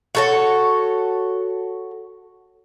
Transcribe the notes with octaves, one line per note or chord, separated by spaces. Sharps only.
F#4 A4 C#5